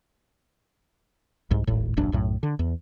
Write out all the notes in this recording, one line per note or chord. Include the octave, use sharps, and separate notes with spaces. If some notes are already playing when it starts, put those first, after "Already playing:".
C2 G#2
D#1 G#1 A2
E1 A#1 F#2 D4
B1 F#2 A2
D3
E2